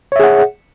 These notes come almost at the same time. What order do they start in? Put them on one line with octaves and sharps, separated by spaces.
C#5 E5 G#4 F#5